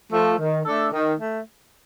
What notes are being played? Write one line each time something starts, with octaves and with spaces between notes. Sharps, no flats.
F3 A3
D#3
A3 D4 A4
D#3
A3